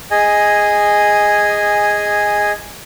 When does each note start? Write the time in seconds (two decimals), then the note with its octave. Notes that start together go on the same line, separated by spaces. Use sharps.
0.11 G#4 D#5 G#5